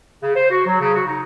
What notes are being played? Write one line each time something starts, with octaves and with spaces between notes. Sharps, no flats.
C#3
C5
F#4
F#3
C#3
F#4
D#4